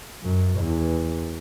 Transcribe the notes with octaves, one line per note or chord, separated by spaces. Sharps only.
F#2
E2